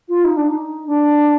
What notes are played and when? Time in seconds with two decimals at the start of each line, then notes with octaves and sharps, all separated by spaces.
0.09 F4
0.24 D#4
0.37 D4
0.48 D#4
0.86 D4